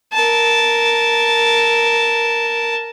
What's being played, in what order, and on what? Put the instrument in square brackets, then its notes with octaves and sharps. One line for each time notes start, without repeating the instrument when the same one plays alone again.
[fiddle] A#4 A5